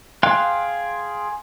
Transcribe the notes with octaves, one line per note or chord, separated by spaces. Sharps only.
G#4 F5 G5 C6 F#6